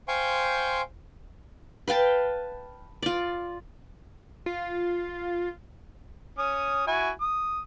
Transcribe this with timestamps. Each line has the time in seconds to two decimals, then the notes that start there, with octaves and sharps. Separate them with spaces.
0.08 C5 F5 G5 G#5 C6 C#6
1.88 B4 F5 G5 A5
3.02 F4 D5
4.46 F4
6.38 C#4 D#6
6.87 E4 F#4 G#5
7.21 D#6